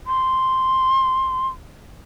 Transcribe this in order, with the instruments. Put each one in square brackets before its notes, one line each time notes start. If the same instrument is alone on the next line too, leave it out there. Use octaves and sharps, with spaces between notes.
[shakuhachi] C6